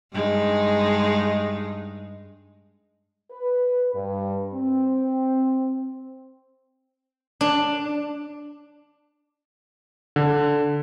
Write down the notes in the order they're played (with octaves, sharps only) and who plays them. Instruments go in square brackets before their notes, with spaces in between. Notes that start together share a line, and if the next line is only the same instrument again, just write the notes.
[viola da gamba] G2 G#3 D#4
[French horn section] B4
G2
C4
[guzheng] D4
[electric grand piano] D3